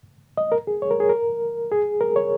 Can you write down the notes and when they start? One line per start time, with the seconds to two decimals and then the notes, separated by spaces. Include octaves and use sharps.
0.37 D#5
0.52 A#4
0.67 G#4
0.82 C#5
0.91 A#4
1.00 G#4
1.09 A#4
1.72 G#4
2.01 A#4
2.16 C#5